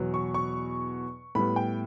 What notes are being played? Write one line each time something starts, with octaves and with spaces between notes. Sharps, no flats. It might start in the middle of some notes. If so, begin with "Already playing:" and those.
Already playing: E2 B2 F#3 B3
C#6
C#6
A2 G3 B3 B5
G5